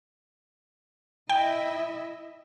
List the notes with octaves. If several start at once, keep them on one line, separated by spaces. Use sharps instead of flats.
E4 D#5 E5 G5